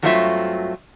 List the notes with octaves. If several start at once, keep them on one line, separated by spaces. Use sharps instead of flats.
G2 F#3 A3 C4 F4 E5